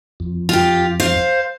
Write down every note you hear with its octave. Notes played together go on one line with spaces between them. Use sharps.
F2
F4 G4
C5 F5